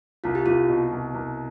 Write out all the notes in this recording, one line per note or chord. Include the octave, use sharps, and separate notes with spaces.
C2 F4
G4
C2 F4
B2
C2
C2